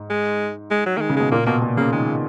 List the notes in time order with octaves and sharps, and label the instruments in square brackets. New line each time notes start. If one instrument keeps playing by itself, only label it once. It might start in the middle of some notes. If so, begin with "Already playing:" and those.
Already playing: [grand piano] G#2
[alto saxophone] G#3
G#3
F#3
[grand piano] D#3 [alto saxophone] A#3
[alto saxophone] G#3
[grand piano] C#3
[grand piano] B2 [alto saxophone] G#3
[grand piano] A#2 [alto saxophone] A#3
[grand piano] B2 [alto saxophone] A#3
[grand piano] B2
[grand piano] C#3 [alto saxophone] A#3
[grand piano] D#3 [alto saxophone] G#3